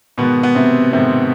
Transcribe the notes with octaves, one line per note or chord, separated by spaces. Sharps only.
G#2 B2 D#3 B3
B3
C3 C4
G#2 C3 D#3 C4